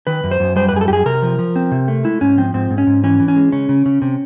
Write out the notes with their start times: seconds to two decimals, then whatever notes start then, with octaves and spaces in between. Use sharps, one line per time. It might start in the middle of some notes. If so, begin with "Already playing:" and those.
0.07 D#3 B4
0.24 F#2
0.31 C5
0.40 F#2
0.56 G3 C5
0.69 B4
0.73 F#2 G#4
0.81 A4
0.88 F#2 G4 G#4
1.06 C3 A#4
1.22 F3
1.39 F3
1.56 C4
1.71 C3
1.88 A3
2.04 G#3 E4
2.21 G#2 C#4
2.38 F3 C4
2.54 G#2 C4
2.71 G#2
2.78 C#4
2.87 G#2
3.04 E3 C#4
3.20 E3
3.28 C#4
3.36 G#3
3.52 C#3 C#4
3.69 C#3
3.86 C#3
4.02 C3